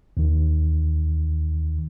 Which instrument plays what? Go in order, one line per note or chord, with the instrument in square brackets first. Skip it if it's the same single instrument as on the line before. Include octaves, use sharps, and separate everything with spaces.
[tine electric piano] D#2 D#3